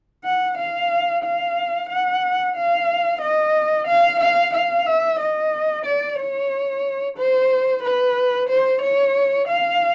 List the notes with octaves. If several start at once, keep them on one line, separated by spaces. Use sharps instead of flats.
F#5
F5
F5
F#5
F5
D#5
F5
F5
F5
E5
D#5
D5
C#5
C5
B4
C5
C#5
F5